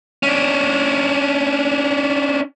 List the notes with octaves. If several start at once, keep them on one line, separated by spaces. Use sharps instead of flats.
C#4 D4